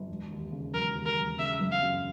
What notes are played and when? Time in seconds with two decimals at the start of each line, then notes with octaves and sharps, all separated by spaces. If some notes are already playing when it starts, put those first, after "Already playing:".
Already playing: G1
0.09 E1
0.31 D#2
0.52 C#3
0.74 E1 A#4
0.95 D#2
1.06 A#4
1.17 E1
1.39 C#3 E5
1.60 G1
1.72 F5
1.82 F#2